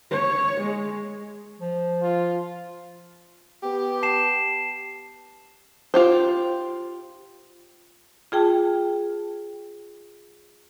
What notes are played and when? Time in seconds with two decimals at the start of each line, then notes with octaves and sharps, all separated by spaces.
0.11 C#5
0.61 G#3
1.61 F3
2.02 F4
3.63 B3 G4
4.03 A5 C7 E7
5.94 F4 G4 C5
8.32 F4 G#4 G5 A5